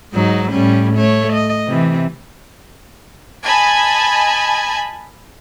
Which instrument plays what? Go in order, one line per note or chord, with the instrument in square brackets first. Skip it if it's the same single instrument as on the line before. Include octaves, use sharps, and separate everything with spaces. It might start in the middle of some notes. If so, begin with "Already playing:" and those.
[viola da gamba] G#2 F#3 D#4
A2 G3 C#4
A3 C#5
D#5
C3 E3
[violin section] D#5 G#5 A5 B5